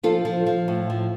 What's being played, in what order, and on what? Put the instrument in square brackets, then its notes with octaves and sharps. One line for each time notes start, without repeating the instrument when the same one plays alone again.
[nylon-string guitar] F3 F4 A4
F3
F3
A2
F3